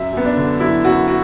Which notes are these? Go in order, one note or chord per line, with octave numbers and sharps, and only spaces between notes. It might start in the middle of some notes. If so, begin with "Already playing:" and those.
Already playing: F#2 E5
F#2 B3
D4
D3
F#3 E4
F#2 F#4
F#4